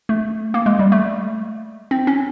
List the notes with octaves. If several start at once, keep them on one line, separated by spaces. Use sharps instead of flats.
A3
A#3
G#3
G3
A3
C4
C#4